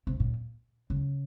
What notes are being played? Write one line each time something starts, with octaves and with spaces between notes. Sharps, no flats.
C3
A#2
C#3